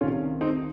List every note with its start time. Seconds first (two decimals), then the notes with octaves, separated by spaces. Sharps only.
0.01 C2 C3 D#3 C#4 F4
0.41 C4 D#4